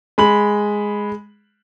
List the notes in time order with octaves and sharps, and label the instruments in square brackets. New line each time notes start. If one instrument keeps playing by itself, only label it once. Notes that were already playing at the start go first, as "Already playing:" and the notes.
[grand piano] G#3 B5 F#7